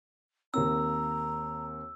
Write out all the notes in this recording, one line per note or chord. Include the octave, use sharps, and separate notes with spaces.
D#2 A#3 C4 A#5 E6